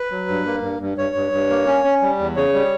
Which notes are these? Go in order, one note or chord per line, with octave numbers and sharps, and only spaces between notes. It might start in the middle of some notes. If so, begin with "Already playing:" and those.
Already playing: B4
F#3
G2
A#3
G2
G2
G2 C#5
G2
G2
A#3
C#4
C#4
G3
E2
C#3 C#5
G3